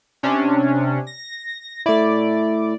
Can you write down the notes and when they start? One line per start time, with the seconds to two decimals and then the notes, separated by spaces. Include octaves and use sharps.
0.23 C3 C#4 D4
1.07 A#6
1.86 A3 E4 D5